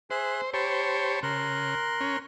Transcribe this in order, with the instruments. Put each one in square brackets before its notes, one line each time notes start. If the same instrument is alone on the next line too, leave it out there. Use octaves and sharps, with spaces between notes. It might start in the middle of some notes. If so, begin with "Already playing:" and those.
[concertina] G#4 E5 F#6 [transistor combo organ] C5
[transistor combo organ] G4 C5 C#5 [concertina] A5 B5
[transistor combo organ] C#3 [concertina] A#4 C6 F#6
[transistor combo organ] C#4